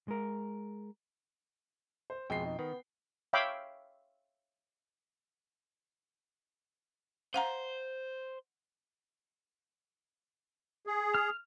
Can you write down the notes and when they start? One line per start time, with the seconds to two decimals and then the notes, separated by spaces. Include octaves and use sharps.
0.08 G#3 A#4
2.10 C5
2.30 F2 B2 G#3 G5 C7
2.45 D#4
2.59 D#3 B3
3.33 C#5 E5 F5 G5 B5 D6
7.34 C5 F5 F#5 A#5
10.87 G#4
11.14 F6